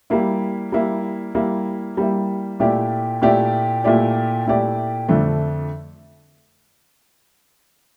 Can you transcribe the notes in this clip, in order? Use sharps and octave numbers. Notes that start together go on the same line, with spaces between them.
G3 A#3 E4
G3 A#3 E4
G3 A#3 E4
G3 A#3 E4
A#2 A3 E4 G4 D5
A#2 A3 E4 G4 D5
A#2 A3 E4 G4 D5
A#2 A3 E4 G4 D5
F2 D3 A3 D4